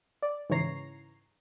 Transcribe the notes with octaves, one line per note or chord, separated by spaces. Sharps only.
D5
G#2 C#3 E3 C#5 A#5 C7